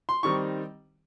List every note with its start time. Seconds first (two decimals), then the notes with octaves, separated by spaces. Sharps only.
0.09 C6
0.23 D#3 G3 C4 D#4 C#6